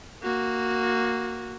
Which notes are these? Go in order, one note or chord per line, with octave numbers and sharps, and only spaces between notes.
A#3 F#4